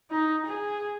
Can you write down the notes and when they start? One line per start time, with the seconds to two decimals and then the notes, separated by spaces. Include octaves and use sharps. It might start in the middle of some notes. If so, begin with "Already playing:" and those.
0.11 D#4
0.46 G#4